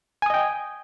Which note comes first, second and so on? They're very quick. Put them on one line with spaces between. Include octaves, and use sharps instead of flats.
G#5 D#6 D#5 G5